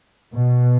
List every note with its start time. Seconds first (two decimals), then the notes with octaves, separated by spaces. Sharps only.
0.34 B2